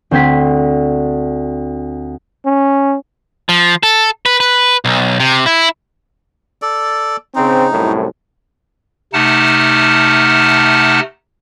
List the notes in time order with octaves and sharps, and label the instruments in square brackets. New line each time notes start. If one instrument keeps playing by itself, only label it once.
[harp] D2 C4 C5 G#6 B6
[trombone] C#4
[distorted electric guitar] F3
A4
B4
B4
B1
C3
E4
[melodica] A4 D5
[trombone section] C#3 C4 [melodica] D#4
[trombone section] C2 F#2 A2
[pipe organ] C3 A3 D#4 F#5 A5 F6